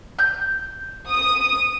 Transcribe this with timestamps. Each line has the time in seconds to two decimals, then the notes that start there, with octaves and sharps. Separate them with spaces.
0.19 G6
1.07 D#6